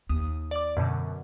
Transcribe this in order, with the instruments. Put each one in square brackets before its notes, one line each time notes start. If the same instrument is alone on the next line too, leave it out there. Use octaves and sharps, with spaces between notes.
[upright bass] D#2 [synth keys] D#6
[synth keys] D5 D6
F#2 B2 D3